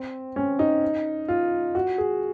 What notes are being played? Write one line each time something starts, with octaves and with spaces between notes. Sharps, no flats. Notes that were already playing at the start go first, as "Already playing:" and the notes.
Already playing: C4
C#4
D#4
F4
F#4
G#4